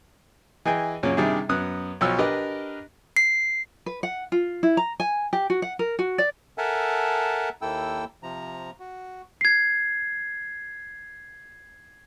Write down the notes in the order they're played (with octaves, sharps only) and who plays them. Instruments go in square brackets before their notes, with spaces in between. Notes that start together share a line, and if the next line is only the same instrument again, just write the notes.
[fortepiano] E3 G#4 D#5 G5 G#5
F#2 A#2 C#3 C#4
C3 D#3 G3 D4 E4 G#4
F#2 B3 D#6 F#6
B1 B2 F3 C#5 E6 F6
D4 G4 A#4 B4 D#5
[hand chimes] C7
[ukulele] B4
F#5
F4
E4
A#5
G#5
G4
F#4
F#5
A#4
F#4
D5
[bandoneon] A4 A#4 E5 F#5 G#5 A5
D#2 A#3 E4 A4 G5 E6
C3 F3 A#5
F#4
[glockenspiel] G#6 C7